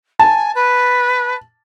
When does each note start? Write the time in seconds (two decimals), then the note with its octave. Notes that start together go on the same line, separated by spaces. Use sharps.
0.19 G#5 A5
0.55 B4